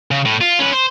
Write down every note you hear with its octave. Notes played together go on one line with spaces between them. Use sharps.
C#3
A2
F4
C#4 B4
C5